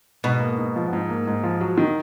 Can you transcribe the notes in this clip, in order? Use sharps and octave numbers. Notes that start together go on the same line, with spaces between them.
G#2 B2
A#3
G#2
F3
G#2
A#3
G#2
F3
F#3
D#3